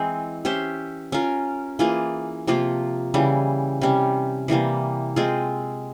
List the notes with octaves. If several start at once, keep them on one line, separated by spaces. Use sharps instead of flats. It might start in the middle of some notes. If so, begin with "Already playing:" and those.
Already playing: E3 G#3 C4
C#4 G4 C5 E5
C#4 F4 A#4
E3 A#3 F4 G#4
C3 F3 A#3 F4
C#3 E3 G3
C3 G3 C#4
C3 E3 G3 A#3
G#3 C4 F4 G#4